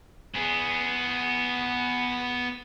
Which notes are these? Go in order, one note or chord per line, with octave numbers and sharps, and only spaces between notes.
B3 G#4